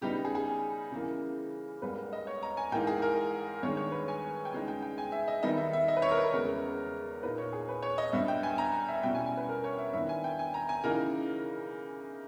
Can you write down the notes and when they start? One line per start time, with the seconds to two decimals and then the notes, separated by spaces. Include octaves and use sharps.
0.01 C#3 G3 B3 D#4 G4
0.25 G#4
0.35 G#4
0.91 C#3 E3 A#3
1.82 G#2 G3 A#3 B4
2.13 D#5
2.27 C#5
2.43 A#5
2.57 G#5
2.72 G#2 E3 A#3 D#4 G5
2.87 G#4
3.02 A#4
3.63 G2 D#3 G#3 C#5
3.77 C#5
3.92 B4
4.08 G#5
4.45 G5
4.53 C#3 G#3 D#4 G#5
4.68 G5
4.82 G5
4.98 G#5
5.12 E5
5.28 D#5
5.43 D#3 G3 B3 D#4 D#5
5.57 E5
5.73 E5
5.88 D#5
5.97 B4
6.02 C#5
6.11 A#4
6.17 B4
6.33 E2 C#3 G#3 A#4
7.23 A#2 A#3 D#4 B4
7.38 C#5
7.53 G#4
7.69 B4
7.82 C#5
7.98 D#5
8.13 G2 G3 B3 E5
8.28 G5
8.43 G#5
8.58 A#5
8.88 E5
9.03 B2 G3 C#4 E4 G5
9.15 G#5
9.26 G#5
9.37 B4
9.49 A#4
9.64 C#5
9.79 E5
9.93 G2 D#3 G3 B3 E4 E5
10.09 G#5
10.24 G5
10.39 G#5
10.54 A#5
10.69 G#5
10.84 C#3 E3 A#3 D#4 A#4